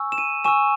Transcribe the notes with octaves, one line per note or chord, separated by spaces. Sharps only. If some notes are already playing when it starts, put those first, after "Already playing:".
Already playing: G#5 C#6 E6
E7
D#7
G#5 C#6 E6 E7